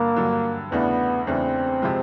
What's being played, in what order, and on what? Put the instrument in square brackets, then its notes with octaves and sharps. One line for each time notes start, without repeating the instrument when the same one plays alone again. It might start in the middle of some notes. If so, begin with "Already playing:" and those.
Already playing: [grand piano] G2 D3 F#3 [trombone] A#3
[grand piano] G2 D3 F#3
[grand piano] E2 C#3 E3 A3 D4 [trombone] B3
[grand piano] E2 C#3 E3 A3 D4 [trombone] C4
[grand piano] C3 F3 G#3